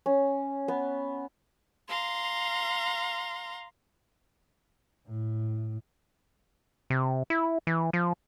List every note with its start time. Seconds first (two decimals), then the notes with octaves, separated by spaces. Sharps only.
0.06 C#4
0.68 B3
1.88 F5 A#5 C6
5.08 A2
6.90 C3
7.30 E4
7.67 E3
7.93 F3